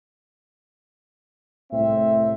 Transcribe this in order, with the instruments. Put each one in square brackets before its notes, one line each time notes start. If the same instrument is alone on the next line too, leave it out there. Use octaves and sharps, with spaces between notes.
[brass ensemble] C2 A2 C4 E5